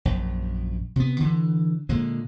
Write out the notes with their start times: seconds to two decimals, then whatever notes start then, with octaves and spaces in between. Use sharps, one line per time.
0.05 A#1 F#2
0.96 C3 B3
1.20 D3 E3
1.89 A#2 D3 G#3